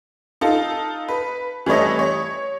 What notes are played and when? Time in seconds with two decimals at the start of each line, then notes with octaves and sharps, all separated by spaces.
0.41 D#4 F4 A4
1.08 B4
1.66 E3 G3 A3 C#5 D#5
1.99 C#5